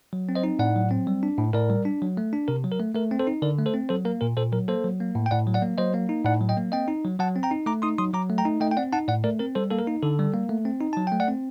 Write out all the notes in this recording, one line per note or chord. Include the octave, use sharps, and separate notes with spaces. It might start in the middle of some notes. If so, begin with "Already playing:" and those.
F#3
C4
C5 D#5
D#4
A2 D5 F#5
F#3
C4
G3
D4
A2
A2 A#4 D5
G3
D4
F#3
A3
D4
C3 A#4
F#3
A#4
A3
A3 A#4
C4
A4 C5
D#4
D3 A#4 D5
A3
A4 C5
C4
F#3 A4 C5
A#3 A#4
A#2 A#4
A#2 A4 C5
F#3 A#4
A#3 A4 C5
F#3
A#3
A2
G5
A2 D5 F#5
F#3
D5 F#5
A#3
F#3 C5 D#5
A#3
D#4
A2 D5 F#5
F#3
D#5 G5
A#3
C4 D#5 G5
D#4
F#3
F#3 F#5 A5
C4
G5 A#5
D#4
A3 A#5 D6
D#4 C6 D#6
F#3 C6 D#6
F#3 A#5 D6
A3
G5 A#5
D#4
A3 D#5 G5
G5
C4 D5 F#5
D#4 F#5 A5
A2 D5 F#5
A3 A#4 D5
C4 A#4
G3 A4 C5
A#3 A4
A#4
D#4
D3 A4
G3
A#3
A3
C4
D#4
F#3 A5
A3 G5
D5 F#5
C4